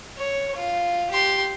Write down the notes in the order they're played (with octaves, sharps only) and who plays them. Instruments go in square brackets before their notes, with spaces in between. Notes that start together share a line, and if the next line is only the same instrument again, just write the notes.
[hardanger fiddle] C#5
F4
G4 C6